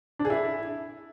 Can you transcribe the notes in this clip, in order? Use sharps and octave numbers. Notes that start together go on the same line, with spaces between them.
D4
G#4
E4